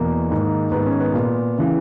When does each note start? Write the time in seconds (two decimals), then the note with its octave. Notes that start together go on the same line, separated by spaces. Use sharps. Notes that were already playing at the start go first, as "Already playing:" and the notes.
Already playing: E2 B2 A#3
0.30 G#2 D#3
0.72 G#2 D#3 B3
0.86 C#4
1.00 B3
1.14 A#2
1.58 C#3 E3